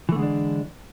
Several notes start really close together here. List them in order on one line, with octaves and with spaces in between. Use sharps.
E3 A3 D3 G#3 D4